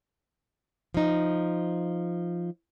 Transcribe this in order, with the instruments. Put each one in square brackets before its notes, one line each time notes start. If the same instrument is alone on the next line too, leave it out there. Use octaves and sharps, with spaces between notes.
[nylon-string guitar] F3 D#4